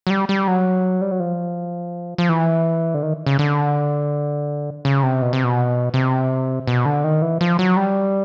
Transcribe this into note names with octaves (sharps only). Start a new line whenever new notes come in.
F#3
G3
G3
F#3
G3
F#3
F3
F3
E3
D3
D#3
C#3
D3
C#3
C3
B2
C3
B2
C3
B2
D3
D#3
E3
F3
F#3
G3